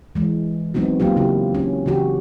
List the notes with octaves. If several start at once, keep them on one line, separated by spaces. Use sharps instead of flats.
E3 G#3
F#3 G#3 B3 C4 D#4 F#4
F#3 A#3 F4 G4
C#3 E4 G4
C#4
C#3 E3 F#4 G4